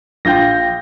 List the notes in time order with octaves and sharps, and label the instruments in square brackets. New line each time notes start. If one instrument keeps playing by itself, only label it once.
[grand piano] A#1 F4 G6 [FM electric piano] G5 A#6